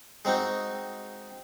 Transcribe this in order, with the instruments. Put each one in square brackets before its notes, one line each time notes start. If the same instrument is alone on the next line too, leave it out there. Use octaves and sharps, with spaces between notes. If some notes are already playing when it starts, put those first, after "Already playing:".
[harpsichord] G#3 C4 D#4 F#4